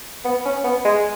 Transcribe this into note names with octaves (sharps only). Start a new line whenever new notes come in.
B3
C#4
B3
G#3